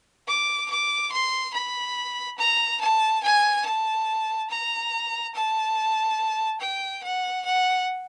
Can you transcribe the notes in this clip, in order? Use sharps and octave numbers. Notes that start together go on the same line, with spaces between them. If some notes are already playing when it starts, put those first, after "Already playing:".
D6
D6
C6
B5
A#5
A5
G#5
A5
A#5
A5
G5
F#5
F#5